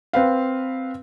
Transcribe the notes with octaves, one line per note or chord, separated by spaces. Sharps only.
C4 B4 F5